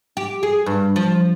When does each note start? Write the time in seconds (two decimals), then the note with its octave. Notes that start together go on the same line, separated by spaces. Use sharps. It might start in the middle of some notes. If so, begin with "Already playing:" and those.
0.17 G4
0.43 G#4
0.66 G2
0.96 F3